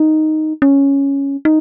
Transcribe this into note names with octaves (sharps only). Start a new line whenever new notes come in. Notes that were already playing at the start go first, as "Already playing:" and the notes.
Already playing: D#4
C#4
D#4